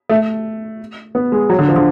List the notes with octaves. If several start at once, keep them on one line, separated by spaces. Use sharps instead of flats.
A3
B3
G#3
F#3
D3
F3
D3